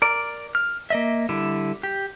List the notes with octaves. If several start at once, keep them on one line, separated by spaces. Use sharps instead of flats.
A#4 D5
F6
A#3 D#5 E5
D3 G3 E4
G4